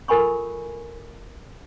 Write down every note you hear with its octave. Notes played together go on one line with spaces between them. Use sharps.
F4 A4 A#4 G#5 B5 C#6